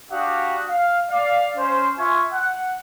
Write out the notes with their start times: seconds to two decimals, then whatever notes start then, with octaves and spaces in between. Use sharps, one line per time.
0.12 D4 F#4 G4 F5 F#5 D#6
0.69 F5
1.11 D5 F5
1.57 C#4 C5
1.98 F4 E5 G#5 C#6
2.33 F#5